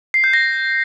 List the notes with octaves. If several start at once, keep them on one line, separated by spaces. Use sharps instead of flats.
C7
G6
A#6